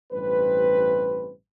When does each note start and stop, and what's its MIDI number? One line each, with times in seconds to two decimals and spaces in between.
0.12 1.32 33
0.12 1.32 43
0.12 1.32 48
0.12 1.32 60
0.12 1.32 71